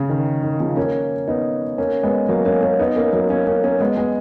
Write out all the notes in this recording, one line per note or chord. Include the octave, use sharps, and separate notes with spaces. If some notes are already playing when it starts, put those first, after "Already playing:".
Already playing: C#3
D#3
D#3
C#3 F3
A#3 C#4
B3 D#4
A#3 C#4
G#3 B3
F#3 A#3
A#3 C#4
A#3 C#4
B3 D#4
A#3 C#4
F#3 A#3
A#3 C#4
A#3 C#4
A#3 C#4
G#3 B3
G#3 B3